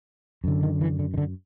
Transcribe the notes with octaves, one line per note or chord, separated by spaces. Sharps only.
F#2 D3
D#3
E3
D3
D#3
D3